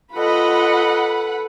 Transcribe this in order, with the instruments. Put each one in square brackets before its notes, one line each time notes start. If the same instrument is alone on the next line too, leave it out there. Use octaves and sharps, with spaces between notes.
[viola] F4 D#5 [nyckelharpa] A4 B4 [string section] F#5 B5